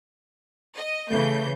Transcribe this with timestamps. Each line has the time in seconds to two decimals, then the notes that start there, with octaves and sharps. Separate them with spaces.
0.76 D#5
1.10 C#3 E3 A3 G6